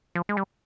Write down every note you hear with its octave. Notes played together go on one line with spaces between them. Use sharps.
F3
G#3
G3